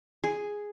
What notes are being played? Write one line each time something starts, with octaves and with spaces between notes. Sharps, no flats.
G#4